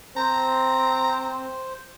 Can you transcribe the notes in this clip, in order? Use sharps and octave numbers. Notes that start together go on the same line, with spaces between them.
C4 C5 A#5